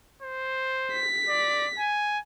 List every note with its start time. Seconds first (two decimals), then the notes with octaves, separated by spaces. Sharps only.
0.22 C5
0.93 B6
1.28 D5
1.79 G#5